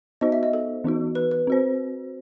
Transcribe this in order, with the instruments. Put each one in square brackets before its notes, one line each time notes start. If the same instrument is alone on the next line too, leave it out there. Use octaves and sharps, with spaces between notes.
[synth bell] B3 D#4 F#4 C5 [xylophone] D#5
[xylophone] E5
D#5
A4
[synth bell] E3 B3 D#4 F#4
[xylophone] B4
B4
[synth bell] C4 F#4 C5